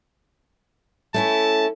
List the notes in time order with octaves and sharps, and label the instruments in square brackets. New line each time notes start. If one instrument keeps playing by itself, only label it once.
[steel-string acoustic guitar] A3 C#4 E4 [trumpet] A5